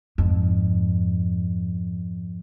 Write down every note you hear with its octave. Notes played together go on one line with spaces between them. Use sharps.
F2 G#2